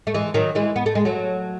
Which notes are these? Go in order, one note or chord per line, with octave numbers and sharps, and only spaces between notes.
A3
E3 G#3
D#3 F#3
E3 G#3
B3
A3
G#3
F#3 A3